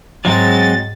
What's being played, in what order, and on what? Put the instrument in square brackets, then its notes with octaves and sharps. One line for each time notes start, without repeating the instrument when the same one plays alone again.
[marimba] G#2 [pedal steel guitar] F#3 G#3 C4 [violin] A6